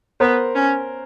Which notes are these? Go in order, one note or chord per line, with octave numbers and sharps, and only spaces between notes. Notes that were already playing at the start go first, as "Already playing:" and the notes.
B3 A#4 C5
C#4